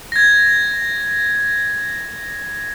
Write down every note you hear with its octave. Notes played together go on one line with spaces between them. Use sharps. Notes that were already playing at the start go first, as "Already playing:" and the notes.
G#6 A#6